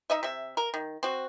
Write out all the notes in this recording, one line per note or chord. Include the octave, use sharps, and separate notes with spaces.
D#4 D#5 E5
C3 E5
A#4
D#3
C4 F#4